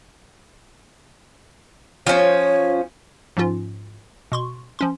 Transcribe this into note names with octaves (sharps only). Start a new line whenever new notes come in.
F3 C#4 C#5
G#2 F3 C#4 F4
B2 C6 C#6
F3 C#4 C6